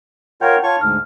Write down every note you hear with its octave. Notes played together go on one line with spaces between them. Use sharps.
F4 A#4 C#5 F#5 G5 G6
F4 C#5 A5 C#6
D2 G#2 F6